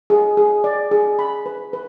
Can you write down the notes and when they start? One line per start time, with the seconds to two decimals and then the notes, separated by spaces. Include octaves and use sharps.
0.10 G#4
0.37 G#4
0.64 D5
0.91 G#4
1.19 B5
1.46 B4
1.73 B4